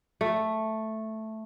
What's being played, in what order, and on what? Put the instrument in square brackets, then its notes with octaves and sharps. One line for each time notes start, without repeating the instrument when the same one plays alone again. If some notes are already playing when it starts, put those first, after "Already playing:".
[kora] A3